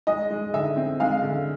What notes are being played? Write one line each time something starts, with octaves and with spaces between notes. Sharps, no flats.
G#3 D#5
G#3
D3 E5
C4
G#3 F5
D3